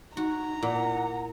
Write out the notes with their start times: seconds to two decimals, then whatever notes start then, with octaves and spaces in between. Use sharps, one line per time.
0.17 D#4 F#4 A#5
0.63 A#2 E4 F#5